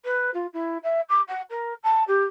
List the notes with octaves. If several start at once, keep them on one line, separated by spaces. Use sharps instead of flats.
B4
F4
E4
E5
D6
F#5
A#4
A5
G4